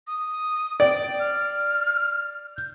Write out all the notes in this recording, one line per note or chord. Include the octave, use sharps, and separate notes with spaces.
D#6
D5 G5
F6
G6